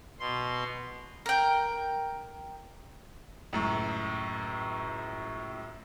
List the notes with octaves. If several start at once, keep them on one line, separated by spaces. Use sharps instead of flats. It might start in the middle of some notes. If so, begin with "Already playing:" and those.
B2 C6
A#4 G5
C#2 F#2 A2